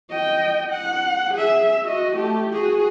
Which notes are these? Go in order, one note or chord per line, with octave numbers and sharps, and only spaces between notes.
D#5 G5
F#5
G#4 E5
F#4 D#5
A3 G4
F#4 G#4